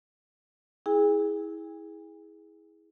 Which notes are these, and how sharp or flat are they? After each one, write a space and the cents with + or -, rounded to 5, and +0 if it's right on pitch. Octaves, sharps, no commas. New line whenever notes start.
E4 -25 G#4 +0 G#5 -45